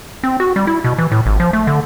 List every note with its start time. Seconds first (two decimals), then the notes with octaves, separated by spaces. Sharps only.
0.24 C4
0.40 F#4
0.56 G3
0.67 E4
0.84 B2
0.98 E3
1.12 A2
1.26 G#1
1.40 F3
1.53 A3
1.67 D3